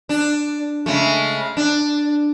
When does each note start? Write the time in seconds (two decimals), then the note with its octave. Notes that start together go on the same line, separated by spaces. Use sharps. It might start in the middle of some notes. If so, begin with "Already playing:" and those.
0.09 D4
0.86 C#3 G#3 A3
1.57 D4